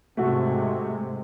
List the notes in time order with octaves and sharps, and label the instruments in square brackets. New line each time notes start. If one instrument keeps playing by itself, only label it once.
[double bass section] G#2 C3 G#3 [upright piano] A3 F#4